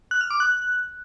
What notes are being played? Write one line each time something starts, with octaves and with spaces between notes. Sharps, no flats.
F#6
F6
D6
F#6